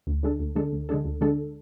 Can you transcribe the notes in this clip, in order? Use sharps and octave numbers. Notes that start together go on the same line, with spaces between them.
D2
D3 G#3 D4 A4
D2
D3 G#3 D4 A4
D2
D3 G#3 D4 A4
D2
D3 G#3 D4 A4